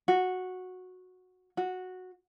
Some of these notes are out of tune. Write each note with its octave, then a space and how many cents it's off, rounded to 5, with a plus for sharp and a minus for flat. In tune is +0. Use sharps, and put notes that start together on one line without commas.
F#4 -10
F#4 -10